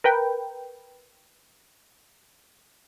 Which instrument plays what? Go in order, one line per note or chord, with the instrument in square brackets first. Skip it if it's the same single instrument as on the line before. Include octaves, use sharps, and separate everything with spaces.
[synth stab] A#4 B4 G5